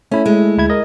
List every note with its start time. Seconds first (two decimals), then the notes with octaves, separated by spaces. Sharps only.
0.11 A3 C#4 E4
0.26 G#3
0.58 D2 E4 G#6
0.70 A#4 D#5